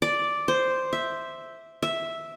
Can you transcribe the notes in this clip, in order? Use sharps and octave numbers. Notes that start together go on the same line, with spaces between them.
D5
C5
E5
E5